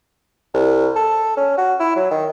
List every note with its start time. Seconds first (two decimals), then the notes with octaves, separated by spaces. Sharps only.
0.54 C2
0.96 A4
1.37 C#4
1.57 F#4
1.80 E4
1.96 F#3
2.11 D#3